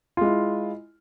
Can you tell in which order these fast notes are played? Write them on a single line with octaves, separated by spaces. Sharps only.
F4 G#3 E4